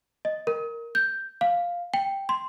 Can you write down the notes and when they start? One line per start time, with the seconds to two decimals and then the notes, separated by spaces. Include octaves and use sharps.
0.25 D#5
0.47 A#4
0.95 G6
1.41 F5
1.94 G5
2.29 C6